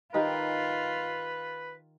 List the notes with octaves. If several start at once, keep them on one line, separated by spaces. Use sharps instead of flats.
D#3 F4 G4 A#4 B4